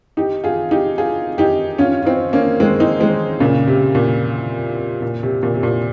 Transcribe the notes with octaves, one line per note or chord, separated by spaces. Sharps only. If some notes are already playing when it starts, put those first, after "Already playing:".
D#4 G4
F4 G#4
D#4 G4
F4 G#4
D#4 G4
C#4 F4
F4
C4 D#4
A#3 C#4
G#3 C4
C4 D#4
G#3 C4
A#2 C#3
C3
A#2
A#2
C3
A#2
C3
A#2